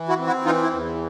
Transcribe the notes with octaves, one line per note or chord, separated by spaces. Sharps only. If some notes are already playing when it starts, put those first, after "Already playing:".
Already playing: E3
E4 F#4
C4
E4 F#4
E3 D#4 F4
E4
E2